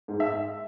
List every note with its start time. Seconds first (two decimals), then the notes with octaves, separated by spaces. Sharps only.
0.08 G#2
0.20 E5